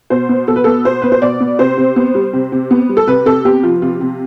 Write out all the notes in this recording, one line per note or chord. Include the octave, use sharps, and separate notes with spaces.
B2 C5
B3
B2 A4
B4
B3 A4
B2 C5
B3 B4
C5
B2 D5
B3
C3 C5
C3
B3
G3
C3
C3
B3
G3
A4
C3 B4
C3 A4
B3 G4
F3 F4
C3 F4
C3